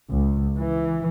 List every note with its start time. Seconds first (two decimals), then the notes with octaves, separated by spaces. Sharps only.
0.11 C#2
0.56 E3